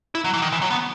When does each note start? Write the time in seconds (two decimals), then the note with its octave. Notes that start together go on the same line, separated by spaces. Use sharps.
0.15 E4
0.24 F#3
0.34 E3
0.42 D#3
0.52 E3
0.62 F#3
0.71 B3